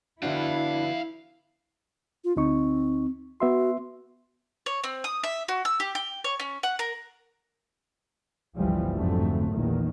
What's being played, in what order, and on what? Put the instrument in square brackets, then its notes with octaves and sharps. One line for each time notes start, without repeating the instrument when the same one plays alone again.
[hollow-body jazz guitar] D3 B3 F#4 [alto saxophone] D4 [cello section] E4 [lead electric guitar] F5 G5
[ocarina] F4
[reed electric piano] D2 D#4 C#6 [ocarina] C4
[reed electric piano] B3 E5 C6 [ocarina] F#4
[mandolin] C#5
C4
D#6
E5
F#4
E6
G4
G5
C#5
C#4
F#5
A#4
[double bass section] G1 C#2 E3 F3 G3
F2 G#2 D3 F#3 A3
A#1 E2 D#3 A#3